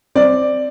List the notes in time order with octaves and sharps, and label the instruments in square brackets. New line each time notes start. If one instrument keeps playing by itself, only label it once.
[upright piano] C4 D5